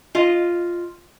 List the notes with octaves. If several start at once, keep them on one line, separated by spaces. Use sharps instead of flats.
F4 D#5